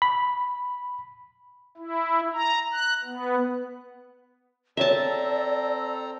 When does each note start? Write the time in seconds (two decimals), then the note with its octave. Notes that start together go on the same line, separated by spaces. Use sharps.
0.02 B5
1.77 E4
2.34 A#5
2.73 F#6
3.04 B3
4.77 C4 G#4 A4 C#5 D5 E5 A5 A#5